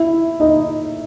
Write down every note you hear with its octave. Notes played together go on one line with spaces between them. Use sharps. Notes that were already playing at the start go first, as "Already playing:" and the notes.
Already playing: E4 E5
D#4 D#5